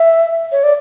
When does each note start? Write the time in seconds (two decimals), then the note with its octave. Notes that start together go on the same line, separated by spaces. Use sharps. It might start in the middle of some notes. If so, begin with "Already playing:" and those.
Already playing: E5
0.52 C#5
0.63 D5